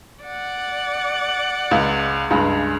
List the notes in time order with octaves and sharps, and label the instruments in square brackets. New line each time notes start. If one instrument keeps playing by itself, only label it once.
[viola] D5 F#5
[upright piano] C#2
C#2 G2 G#3